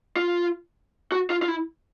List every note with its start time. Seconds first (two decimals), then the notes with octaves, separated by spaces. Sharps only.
0.16 F4
1.12 F#4
1.30 F4
1.42 F4
1.48 E4